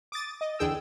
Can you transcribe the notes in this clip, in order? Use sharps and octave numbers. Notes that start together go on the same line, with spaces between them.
D6 D#6 A6
D#5
E2 D3 G#4 G5 E6